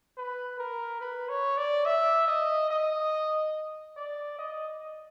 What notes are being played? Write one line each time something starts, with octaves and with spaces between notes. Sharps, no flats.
B4
A#4
B4
C#5
D5
E5
D#5
D#5
D5
D#5